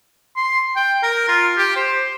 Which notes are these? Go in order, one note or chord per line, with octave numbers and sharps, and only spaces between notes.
C6
G5
A#4
F4
G4
C5